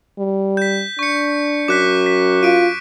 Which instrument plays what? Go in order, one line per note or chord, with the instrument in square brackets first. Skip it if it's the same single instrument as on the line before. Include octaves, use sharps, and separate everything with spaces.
[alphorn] G3
[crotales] G6 B6
[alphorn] D4 [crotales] C#6 C#7
[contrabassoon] F#2 [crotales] D6 F#6 B6
[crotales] B6
[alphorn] F4 [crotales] D6 D7 D#7